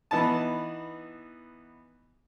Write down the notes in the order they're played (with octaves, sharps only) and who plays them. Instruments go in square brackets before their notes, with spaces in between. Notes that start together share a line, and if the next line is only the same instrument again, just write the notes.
[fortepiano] E3 B3 D#4 A5